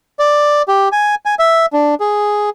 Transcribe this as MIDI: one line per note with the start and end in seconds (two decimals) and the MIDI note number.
0.19 0.62 74
0.68 0.89 67
0.92 1.15 80
1.26 1.35 80
1.39 1.66 76
1.73 1.95 62
2.00 2.50 68